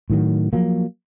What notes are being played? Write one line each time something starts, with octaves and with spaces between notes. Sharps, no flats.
A2 D#3 F#3
F3 F#3 A#3